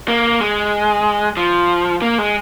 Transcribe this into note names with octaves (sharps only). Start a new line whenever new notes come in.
A#3
G#3
F3
A#3
G#3